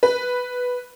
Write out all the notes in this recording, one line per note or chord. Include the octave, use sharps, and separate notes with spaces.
B4